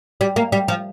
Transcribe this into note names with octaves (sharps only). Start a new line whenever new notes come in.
G3
A#3
G3
F3